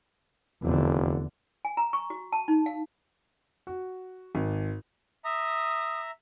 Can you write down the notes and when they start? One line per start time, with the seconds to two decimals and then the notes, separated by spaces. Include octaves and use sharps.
0.63 F1 E2 D3
1.65 G#5
1.77 A#5
1.93 C#6
2.10 F#4
2.32 A5
2.48 D#4
2.66 F5
3.67 F#4
4.35 G#1
5.25 E5 A#5 D#6